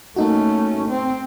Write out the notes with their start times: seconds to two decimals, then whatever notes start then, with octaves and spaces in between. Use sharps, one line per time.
0.16 A3 A#3 C#4 D#4 F#4
0.88 C4